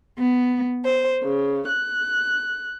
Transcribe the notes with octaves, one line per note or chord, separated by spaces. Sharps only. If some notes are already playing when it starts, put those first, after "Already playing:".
B3
C5
C#3
F#6